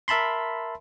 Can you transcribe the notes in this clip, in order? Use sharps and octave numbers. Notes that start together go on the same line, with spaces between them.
A#4 E5 A5 B5 C6